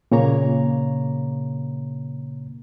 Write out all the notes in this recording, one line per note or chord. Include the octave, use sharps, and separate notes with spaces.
A#2 C#3 A#3 C#5 A#5